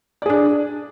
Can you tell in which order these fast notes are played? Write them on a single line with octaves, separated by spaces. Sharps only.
D5 G#4 D4